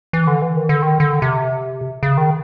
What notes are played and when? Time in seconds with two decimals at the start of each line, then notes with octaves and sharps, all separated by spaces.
0.13 E3
0.27 D3
0.42 E3
0.56 D#3
0.69 D3
0.82 D#3
1.00 D3
1.22 C3
2.03 C#3
2.17 D#3